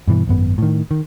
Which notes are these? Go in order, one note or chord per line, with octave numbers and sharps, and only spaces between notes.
G2 B2 E3
G#1 F#2 B3
A2 D#3
D#3